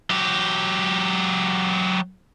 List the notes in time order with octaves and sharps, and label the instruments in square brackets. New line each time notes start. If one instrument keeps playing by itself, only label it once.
[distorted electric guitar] F#3 G4